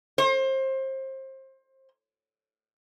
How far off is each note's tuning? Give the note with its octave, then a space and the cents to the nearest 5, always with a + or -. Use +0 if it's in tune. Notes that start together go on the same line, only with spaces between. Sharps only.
C5 +25